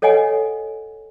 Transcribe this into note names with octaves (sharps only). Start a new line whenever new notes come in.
A4 C#5 D#5 F#5 G#5